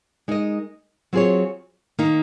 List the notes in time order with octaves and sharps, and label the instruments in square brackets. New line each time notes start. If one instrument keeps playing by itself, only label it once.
[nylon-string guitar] G#3 D#4 A#4 D#5
F#3 C4 F4 G#4 C#5
D#3 A#3 D#4